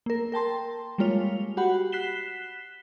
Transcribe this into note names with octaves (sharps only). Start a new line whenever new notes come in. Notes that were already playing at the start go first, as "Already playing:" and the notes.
A#3 A#4
A#4 G5 A5 C6
G3 G#3 A#3 F4 C#5 F7
F#4 G4 F#5 B5
F#6 B6 C7 E7 G7